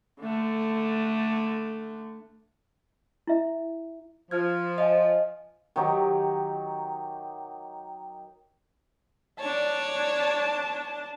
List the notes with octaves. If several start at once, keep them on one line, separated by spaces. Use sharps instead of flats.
D3 A3
E4 E5
F3 F6 G#6
D#5 F5 G#5
D#3 F#3 D#4 G4
D4 C#5 D5 A5